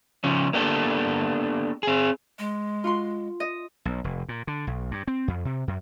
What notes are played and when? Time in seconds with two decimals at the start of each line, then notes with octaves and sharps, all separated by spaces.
0.24 C#3 F3 C#4
0.53 A#3 B3 D4 G4 A4
1.83 C4 G#4
2.39 G#3
2.84 F4 F#4 C6
3.40 D#5
3.85 B1
4.04 F1
4.29 A#2
4.47 D3
4.67 B1
4.91 G2
5.07 C4
5.28 F2
5.45 C3
5.68 F#2